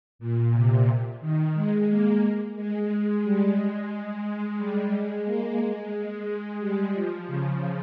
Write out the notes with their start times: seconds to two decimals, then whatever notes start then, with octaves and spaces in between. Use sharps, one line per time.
0.19 A#2
0.53 C3
1.21 D#3
1.54 G#3
1.89 A#3
2.56 G#3
2.89 G#3
3.23 G3
3.56 G#3
3.91 G#3
4.24 G#3
4.58 G3
4.92 G#3
5.25 A#3
5.58 G#3
5.93 G#3
6.60 G3
6.94 F3
7.27 C#3